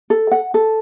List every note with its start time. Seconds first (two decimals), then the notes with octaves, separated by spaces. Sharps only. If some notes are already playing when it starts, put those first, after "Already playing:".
0.10 A4
0.31 F#5
0.54 A4